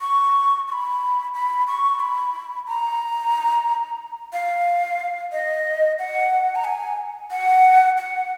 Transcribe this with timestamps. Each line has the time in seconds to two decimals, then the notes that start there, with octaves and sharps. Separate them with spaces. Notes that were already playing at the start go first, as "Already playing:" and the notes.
0.01 C#6
0.68 C#6
0.72 B5
1.34 B5
1.67 C#6
2.00 B5
2.67 A#5
4.33 F5
5.32 D#5
5.99 F#5
6.55 A#5
6.64 G#5
7.31 F#5
7.98 F#5